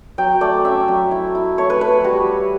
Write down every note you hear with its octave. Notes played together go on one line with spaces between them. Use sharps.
F#3 G5
A3 D5
C#4 E5
F#3
E4
E4
A3 C#5
B4
A3 B4
G3 F#4